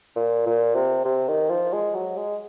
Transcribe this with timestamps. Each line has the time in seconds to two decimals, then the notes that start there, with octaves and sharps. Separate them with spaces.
0.16 A#2
0.46 A#2
0.75 C3
1.05 C3
1.28 D#3
1.50 F3
1.73 G#3
1.94 F#3
2.16 G#3